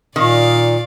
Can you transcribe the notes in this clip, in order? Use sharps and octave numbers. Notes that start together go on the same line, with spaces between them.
A#2 D#3 D5 F5